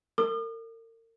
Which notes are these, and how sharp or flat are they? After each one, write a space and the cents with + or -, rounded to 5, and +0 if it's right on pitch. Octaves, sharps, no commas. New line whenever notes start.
A#4 -40 D#6 -45